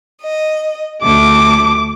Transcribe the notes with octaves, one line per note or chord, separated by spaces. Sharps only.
D#5
D2 A3 D6